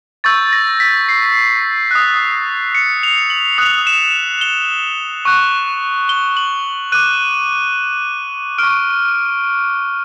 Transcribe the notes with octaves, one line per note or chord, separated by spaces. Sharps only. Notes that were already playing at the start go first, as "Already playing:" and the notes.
C#6 E6 G6 A6
A#6
B6
C7
D#6 F#6
C#7
F7
F#7
D#6 F#6 F7
E7
G7
C#6 F#6
G7
F#7
D6 F#6 D#7
C#6 F6 D7